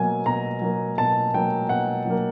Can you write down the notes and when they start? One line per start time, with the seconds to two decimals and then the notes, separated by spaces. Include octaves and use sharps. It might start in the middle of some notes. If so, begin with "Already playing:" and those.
Already playing: B2 F#3 A#3 G#5
0.26 B2 A#5
0.62 F#3 A#3
0.98 B2 A5
1.34 F#3 A#3 G5
1.69 B2 F#5
2.06 F#3 A#3